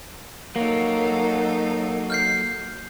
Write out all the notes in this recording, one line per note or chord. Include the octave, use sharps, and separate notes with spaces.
F#3 A#3 D#4 A4 C#5
F6 G6 C7